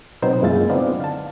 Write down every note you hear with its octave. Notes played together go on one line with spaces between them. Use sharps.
B2 F#3 B3 C4 D#4 C5
F#2 G#3 A#3 E4 F4 A6
D3 B3 C4 D#4 D5 F5
F5 A5